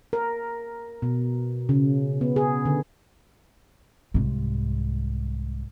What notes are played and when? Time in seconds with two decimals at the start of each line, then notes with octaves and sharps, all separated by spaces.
0.13 A#4
1.02 B2
1.69 C#3
2.21 B3
2.36 G#4
2.65 D3
4.14 C2 G#2